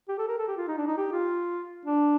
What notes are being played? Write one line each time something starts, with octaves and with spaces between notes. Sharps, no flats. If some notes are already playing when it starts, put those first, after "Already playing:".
G4
A4
A#4
A4
G4
F4
D#4
D4
D#4
G4
F4
D4